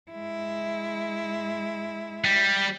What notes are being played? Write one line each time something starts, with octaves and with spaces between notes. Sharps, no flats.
G#3 E4
G3